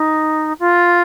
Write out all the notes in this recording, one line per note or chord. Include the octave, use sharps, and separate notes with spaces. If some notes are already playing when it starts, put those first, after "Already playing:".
Already playing: D#4
F4